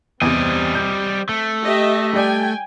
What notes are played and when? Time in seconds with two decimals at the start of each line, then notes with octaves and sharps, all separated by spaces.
0.22 E2 C3 G3 C4 D#5
0.75 G6
1.29 A3
1.63 G4 D#5 E5
2.13 G3 D5 G5 G#5